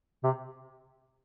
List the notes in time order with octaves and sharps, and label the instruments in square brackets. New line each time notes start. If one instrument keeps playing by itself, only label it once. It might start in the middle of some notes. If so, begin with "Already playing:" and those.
[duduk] C3